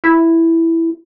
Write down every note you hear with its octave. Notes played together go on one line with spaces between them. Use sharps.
E4